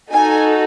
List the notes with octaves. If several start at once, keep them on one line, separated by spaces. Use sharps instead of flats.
D#4 F#4 A4 G#5